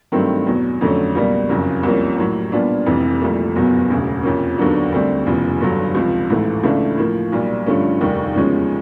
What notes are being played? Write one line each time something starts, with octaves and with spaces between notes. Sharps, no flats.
G2 D#3 F#3 A3 C4
E2 B2 F#3
F2 D3 F#3 A3 C#4
C#2 B2 G3 A#3
F#1 F2 C#3 F#3
C2 C3 F3 A#3 C#4
A2 F#3 A#3
A#2 G3 B3 D4 F4
F1 F2 C3 E3
C2 A#2 F3 A3
F#1 E2 B2 F#3 B3
E1 D2 C#3
F2 C3 F3 A#3 C#4
D#2 D3 F#3 B3 D4
D2 D3 G3 C4
F1 E2 C#3 F3
G1 G2 D3 F#3
C#2 C3 F3
A1 G#2 E3 A3
C#2 C#3 E3 A3 D4
A2 F3 A#3
B1 A#2 G3
G2 D3 F3 A3 C#4
F1 D#2 D#3 G3
E2 C#3 F3 G#3 C#4